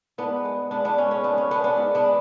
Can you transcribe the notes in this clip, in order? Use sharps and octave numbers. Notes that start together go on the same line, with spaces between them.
G#2 B3 D4
G#3
G#2 B3 D4
B3 D4
G#3 C#4
C#4
G#2 B3 D4
C#4
G#3 B3 D4
B3 D4
G#2
B3 D4
G#3